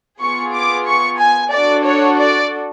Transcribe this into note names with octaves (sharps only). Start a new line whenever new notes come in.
B3 F4 G#4 C#6
D6
C#6
G#5
D4 F#4 A4 D5
C#5
D5